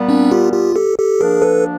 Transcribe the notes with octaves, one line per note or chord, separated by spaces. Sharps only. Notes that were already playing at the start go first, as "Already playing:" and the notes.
Already playing: A#2 G3 B3
C4 D4
F4 G4
F4 G4
G4 A4
G4 A4
D2 D3 F3 A#3 D4 G#4 A#4
A4 B4